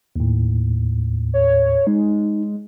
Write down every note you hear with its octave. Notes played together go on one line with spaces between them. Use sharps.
D#2 A2
C#5
G#3 D#4